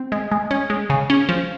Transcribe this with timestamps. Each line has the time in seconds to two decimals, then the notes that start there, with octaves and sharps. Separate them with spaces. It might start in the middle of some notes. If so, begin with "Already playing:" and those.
Already playing: C4
0.12 G#3
0.31 G#3
0.51 C#4
0.70 G#3
0.90 C#3
1.10 C#4
1.29 F3